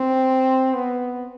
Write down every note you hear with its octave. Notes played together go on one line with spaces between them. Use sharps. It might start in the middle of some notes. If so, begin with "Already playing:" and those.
Already playing: C4
B3